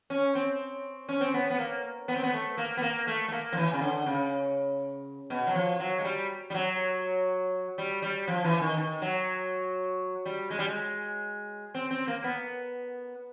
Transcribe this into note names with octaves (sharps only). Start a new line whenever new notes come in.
C#4
C4
C#4
C4
B3
B3
A#3
B3
C4
B3
A3
A#3
B3
A#3
A3
A3
A#3
F3
E3
C#3
D3
C#3
B2
F#3
F3
F#3
G#3
G3
G3
F#3
G3
G3
F3
E3
D#3
D#3
F#3
G3
G#3
G3
G#3
C4
C4
A#3
B3